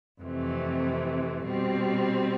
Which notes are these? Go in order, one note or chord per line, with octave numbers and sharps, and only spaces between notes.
F2 C3 E3 A3
B2 G3 C4